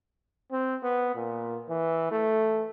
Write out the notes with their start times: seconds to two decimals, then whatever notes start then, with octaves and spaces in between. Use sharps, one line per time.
0.52 C4
0.83 B3
1.15 A#2
1.69 E3
2.11 A3